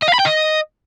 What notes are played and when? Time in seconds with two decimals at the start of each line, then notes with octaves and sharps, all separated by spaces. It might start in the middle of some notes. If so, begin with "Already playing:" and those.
0.02 D#5
0.08 F5
0.14 B5
0.19 G5
0.25 D#5